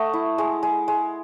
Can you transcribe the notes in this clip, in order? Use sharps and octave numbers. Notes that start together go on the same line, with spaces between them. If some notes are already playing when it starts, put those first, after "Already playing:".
Already playing: A3 D#5 F#5
E4
G#3
G#3
G#3